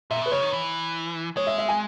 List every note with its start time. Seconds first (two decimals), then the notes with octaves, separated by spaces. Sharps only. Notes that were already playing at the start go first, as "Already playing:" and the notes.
0.11 A#2 E5
0.22 B2 B4
0.31 C#3 C#5
0.42 D#3
0.53 E3
1.37 G#3 C#5
1.47 E5
1.58 E5
1.69 G#5